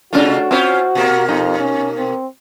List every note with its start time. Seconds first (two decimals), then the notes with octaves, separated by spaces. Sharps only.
0.13 C3 A3 C#4 D4 F4 F#4
0.51 C4 C#4 E4 F4 C5
0.95 B2 A#3
1.29 F2 D#4
1.59 C#4
1.98 C4